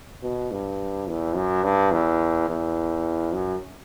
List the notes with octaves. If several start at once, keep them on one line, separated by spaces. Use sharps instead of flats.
B2
G2
E2
F#2
G2
E2
E2
F#2